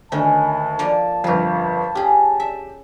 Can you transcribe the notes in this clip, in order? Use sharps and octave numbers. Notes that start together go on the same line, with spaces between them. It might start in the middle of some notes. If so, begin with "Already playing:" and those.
D2 D#3 C#4 A5
F3 A#3 D5
G1 F2 F3 A#4
C#4 G4 G#4
E5